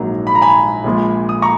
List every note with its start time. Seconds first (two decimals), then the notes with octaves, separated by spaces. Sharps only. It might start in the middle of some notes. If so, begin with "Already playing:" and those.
Already playing: A#1 G#2 F#3 A#3
0.27 B5
0.35 A#5
0.41 G#5 B5
0.84 A#1 A#2 F3 G#3
1.29 D#6
1.42 A#5 C#6